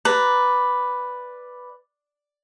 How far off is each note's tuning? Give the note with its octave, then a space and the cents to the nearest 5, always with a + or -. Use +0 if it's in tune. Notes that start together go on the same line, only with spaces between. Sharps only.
B4 +0 D5 +0 A#5 +0